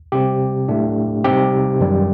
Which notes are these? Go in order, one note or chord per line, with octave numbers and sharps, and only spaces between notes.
C3 G3 C4 G4
A2 A3 D4
C3 G3 C4 D#4 G4
F#2 D#3 G3